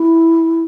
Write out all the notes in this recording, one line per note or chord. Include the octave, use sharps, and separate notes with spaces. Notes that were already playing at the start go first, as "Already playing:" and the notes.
Already playing: E4